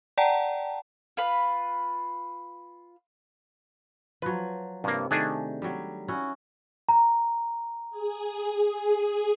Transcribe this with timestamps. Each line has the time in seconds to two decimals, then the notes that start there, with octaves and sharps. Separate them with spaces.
0.18 D5 F#5 G5 A5 A#5
1.17 F4 B4 B5
4.22 F3 F#3 B4
4.84 G2 C3 A#3
5.11 D#3 A3 D4 G#4
5.62 F#3 G3
6.08 C#4 E4 F#4
6.89 A#5
7.90 G#4